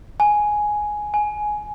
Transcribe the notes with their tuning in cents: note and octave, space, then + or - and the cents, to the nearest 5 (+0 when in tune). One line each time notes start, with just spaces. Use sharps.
G#5 +5
G#5 +15